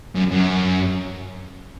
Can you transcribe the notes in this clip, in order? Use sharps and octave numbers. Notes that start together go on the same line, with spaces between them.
F#2
F#2